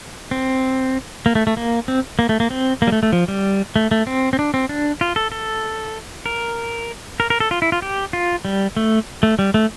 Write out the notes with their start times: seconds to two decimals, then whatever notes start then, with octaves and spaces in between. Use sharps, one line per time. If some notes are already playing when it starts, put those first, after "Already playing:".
0.31 C4
1.26 A#3
1.35 A3
1.47 A3
1.57 A#3
1.88 C4
2.19 A#3
2.29 A3
2.40 A#3
2.50 C4
2.82 A#3
2.87 G3
2.92 A3
3.03 A3
3.13 F3
3.28 G3
3.76 A3
3.91 A3
4.07 C4
4.33 C4
4.39 D4
4.54 C4
4.69 D4
5.01 F4
5.16 A4
5.32 A4
6.26 A#4
7.20 A#4
7.30 A#4
7.40 A4
7.51 F4
7.62 E4
7.72 F4
7.82 G4
8.13 F4
8.45 G3
8.77 A3
9.23 A3
9.39 G3
9.54 A3